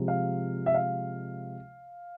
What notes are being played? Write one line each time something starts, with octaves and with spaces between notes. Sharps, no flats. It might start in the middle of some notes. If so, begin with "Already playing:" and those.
Already playing: C3 F3 G#3
F5
E5
F5